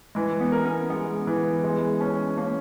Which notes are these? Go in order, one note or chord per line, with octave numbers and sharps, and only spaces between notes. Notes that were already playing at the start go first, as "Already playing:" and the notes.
E3 G#3
B3
A#4
C#4
G#3 B3
E3
G#3
C#4
A#3 C#4